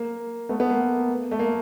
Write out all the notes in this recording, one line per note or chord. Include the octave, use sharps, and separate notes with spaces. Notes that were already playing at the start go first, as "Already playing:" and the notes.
Already playing: A#3
A3 B3
A3 B3
A#3
A3
A#3